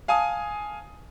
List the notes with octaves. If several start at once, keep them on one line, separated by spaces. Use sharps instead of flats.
F5 G#5 A5 D#6